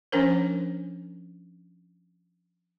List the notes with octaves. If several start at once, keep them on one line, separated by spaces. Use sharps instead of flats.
F3 C#4 D4 A#4 C5